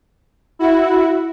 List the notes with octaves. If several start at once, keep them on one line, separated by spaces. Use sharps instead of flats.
E4 F#4